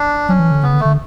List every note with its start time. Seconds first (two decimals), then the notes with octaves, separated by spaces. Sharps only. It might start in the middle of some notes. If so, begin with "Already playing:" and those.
Already playing: D4
0.29 F#3 C#4
0.39 E3
0.51 D3
0.63 C#3 B3
0.74 D3
0.80 A3
0.85 D3